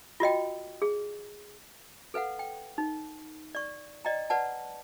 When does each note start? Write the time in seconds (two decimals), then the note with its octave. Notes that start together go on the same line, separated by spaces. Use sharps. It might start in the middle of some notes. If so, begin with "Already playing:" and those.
0.20 F4 F#4 D#5 G5
0.82 G#4
2.14 A4 B4 F5 F#5
2.39 G5
2.78 D#4
3.55 D5 C#6
4.05 D5 D#5 G5 A#5
4.30 B4 D5 F#5 A5